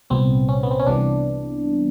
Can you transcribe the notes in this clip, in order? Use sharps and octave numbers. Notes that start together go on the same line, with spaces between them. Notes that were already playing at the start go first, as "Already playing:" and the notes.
C2 A#2 G3 B3 C4
C#4
B3
C4
C#4
C2 C3 E3 G3 B3 D4